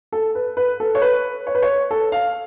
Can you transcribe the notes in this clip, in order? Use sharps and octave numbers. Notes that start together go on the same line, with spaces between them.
A4
B4
B4
A4
C#5
B4
C#5
B4
C#5
A4
F5